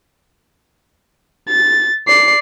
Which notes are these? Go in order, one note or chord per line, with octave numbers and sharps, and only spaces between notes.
A6
D5 C7